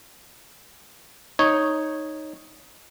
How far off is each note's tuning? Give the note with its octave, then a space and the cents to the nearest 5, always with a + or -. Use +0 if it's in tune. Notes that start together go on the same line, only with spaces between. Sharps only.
D#4 +0 C#5 -10